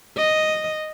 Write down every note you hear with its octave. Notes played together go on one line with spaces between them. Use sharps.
D#5